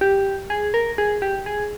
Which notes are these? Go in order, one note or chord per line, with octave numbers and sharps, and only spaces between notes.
G4
G#4
A#4
G#4
G4
G#4